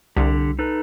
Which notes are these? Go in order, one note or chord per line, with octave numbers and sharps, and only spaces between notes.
C2 D3 G4
D#4 A4 B4